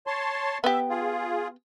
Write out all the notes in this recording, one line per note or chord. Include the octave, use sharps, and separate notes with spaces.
C#5 A5 C6
B3 G4 E5
F4 G#4